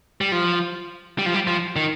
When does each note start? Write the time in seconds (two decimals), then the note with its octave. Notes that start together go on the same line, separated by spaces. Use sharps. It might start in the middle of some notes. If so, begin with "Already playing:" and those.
0.21 G3
0.32 F3
1.19 G3
1.26 F3
1.34 G3
1.47 F3
1.76 D#3